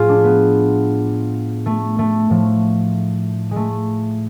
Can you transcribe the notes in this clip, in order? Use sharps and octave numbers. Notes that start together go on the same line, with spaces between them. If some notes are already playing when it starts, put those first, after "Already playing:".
Already playing: A2 F3 F4 G#4
D4
B3
A3
A3
A2 F3
G#3
A3